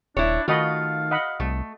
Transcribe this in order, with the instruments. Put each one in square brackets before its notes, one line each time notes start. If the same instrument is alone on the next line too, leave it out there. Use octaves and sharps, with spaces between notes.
[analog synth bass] D#1 [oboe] D4 [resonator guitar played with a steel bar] E4 C#5
[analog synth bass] D#3 [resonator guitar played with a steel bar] A3 F4 [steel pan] F#4 D#5 B5 [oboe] F5
[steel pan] D#5 F#5 B5
[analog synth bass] C2 [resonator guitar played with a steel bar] A3